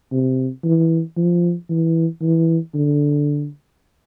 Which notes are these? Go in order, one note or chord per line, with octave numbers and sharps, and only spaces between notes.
C3
E3
F3
E3
E3
D3